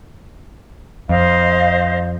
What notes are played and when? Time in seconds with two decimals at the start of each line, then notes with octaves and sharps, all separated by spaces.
1.09 F2 C5 D#5 F5